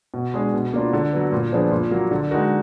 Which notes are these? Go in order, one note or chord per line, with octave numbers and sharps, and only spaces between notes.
B2
G#3 D4 G#4
B2
A#3 D4 F4
D3
F#3 B3
A#2
F3 B3 D4 G#4
A#2
F#3 A#3
D3
G#3 D#4 F#4 A#4